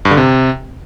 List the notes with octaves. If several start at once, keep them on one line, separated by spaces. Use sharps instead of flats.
G2
D3
C3